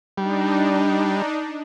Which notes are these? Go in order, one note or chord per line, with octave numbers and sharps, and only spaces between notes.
G3 D4 D#4